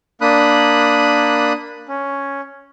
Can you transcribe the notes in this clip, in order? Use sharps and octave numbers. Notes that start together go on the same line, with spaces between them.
A#3 D4 B5 D#6 F#6
C#4